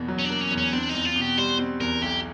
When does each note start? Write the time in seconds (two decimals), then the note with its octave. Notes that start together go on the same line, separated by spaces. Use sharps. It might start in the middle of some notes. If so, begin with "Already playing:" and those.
Already playing: E2 B2 A#3
0.08 F#3
0.19 C#4
0.25 D4
0.30 A#3
0.41 C#4
0.51 E2
0.57 C#4
0.73 C4 D4
0.89 E2 D#4
1.05 F4
1.16 B2
1.21 G4
1.38 G3 C5
1.59 C4
1.81 E2 A#4
2.02 B1 G4